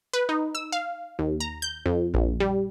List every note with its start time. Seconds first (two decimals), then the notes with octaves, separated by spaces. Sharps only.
0.14 B4
0.29 D#4
0.55 E6
0.72 F5
1.19 D#2
1.40 A#5
1.62 G6
1.86 F2
2.14 A#1
2.40 G3